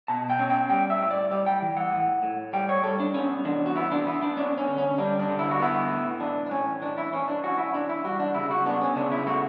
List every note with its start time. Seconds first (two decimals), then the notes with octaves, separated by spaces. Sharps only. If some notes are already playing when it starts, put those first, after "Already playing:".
0.08 B2 A5
0.30 G5
0.39 C#4
0.50 G5
0.70 G3 G5
0.90 E5
1.01 A2
1.11 D5
1.31 G3 D5
1.46 G5
1.62 E3
1.77 F#5
1.92 A2
2.23 A2
2.53 G3 G5
2.69 C#5
2.84 G3 A4
3.00 D4
3.14 B3 C#4
3.45 E3 D4
3.66 F#4
3.76 B3 E4
3.92 D4
4.06 B3 E4
4.22 D4
4.37 C#4 D4
4.58 C#4
4.67 D3
4.78 C#4
4.98 G3 D4
5.19 D4
5.29 D3
5.39 E4
5.51 F#4
5.60 B3 E4
5.91 A2
6.20 E3 D4
6.46 D4
6.51 A2 C#4
6.82 E3 D4
6.98 E4
7.13 E3 C#4
7.28 D4
7.43 C#4 F#4
7.58 E4
7.74 E3 D4
7.89 E4
8.04 G3 F#4
8.20 D4
8.35 C#3 E4
8.51 F#4
8.66 B3 D4
8.81 C#4
8.96 C#3 D4
9.11 E4
9.27 A3 F#4